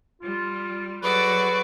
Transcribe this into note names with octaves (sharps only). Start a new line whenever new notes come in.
G3 F4
F#3 F#4 G#4 A4 B4 D5